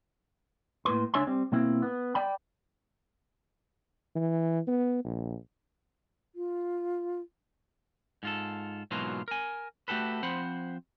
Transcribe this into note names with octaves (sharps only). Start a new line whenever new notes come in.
A2 A#3 B4 C6
C#2 D4 C#5 E5 G#5 C6
G3 C4
B2 A#3 C4 E4
B3
D5 G5 B5
E3
B3
A#1
F4
G#2 F4 A4
G#2 B2 E3 F#3 A#3 F4
A#4 G#5
A3 F#4 G4 A4 B4
F3 C4 C5 F#5 B5